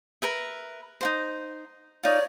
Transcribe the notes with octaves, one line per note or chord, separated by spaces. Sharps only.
A#4 B4 E5
D#4 F#4 C5
D#4 F4 C#5 D5